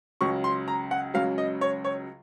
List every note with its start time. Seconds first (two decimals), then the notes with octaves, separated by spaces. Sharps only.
0.21 C#2 C#3 F#3 C#6
0.44 C6
0.68 A#5
0.91 F#5
1.14 C#2 C#3 F#3 F5
1.38 D#5
1.61 C#5
1.85 C#5